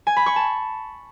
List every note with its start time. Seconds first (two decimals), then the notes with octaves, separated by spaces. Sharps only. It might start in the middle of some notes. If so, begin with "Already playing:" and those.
0.07 G#5
0.16 B5
0.26 C#6
0.36 A5